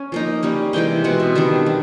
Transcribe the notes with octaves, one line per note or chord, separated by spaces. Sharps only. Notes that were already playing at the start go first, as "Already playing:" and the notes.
Already playing: C#4 G#5
F3 A#3 D#4
G3 A#3 C#4
C3 E3 G#3 G5
B2 G#3 C4 F#5
E5
D#3 G3 B3 D4 E5
F#3